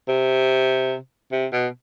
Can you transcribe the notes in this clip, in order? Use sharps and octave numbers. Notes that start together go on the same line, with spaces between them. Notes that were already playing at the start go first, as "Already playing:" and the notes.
C3
C3
B2